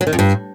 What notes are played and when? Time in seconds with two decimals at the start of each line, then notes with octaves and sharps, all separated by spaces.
0.01 F#3
0.07 D#3
0.13 F2
0.19 G2